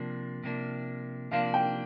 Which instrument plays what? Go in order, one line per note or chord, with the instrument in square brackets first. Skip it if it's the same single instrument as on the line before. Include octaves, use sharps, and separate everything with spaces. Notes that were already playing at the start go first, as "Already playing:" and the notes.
Already playing: [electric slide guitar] C3 F3 A#3 D4
C3 F3 A#3 D4
[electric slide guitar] C3 F3 A#3 D4 [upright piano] F5
[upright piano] G5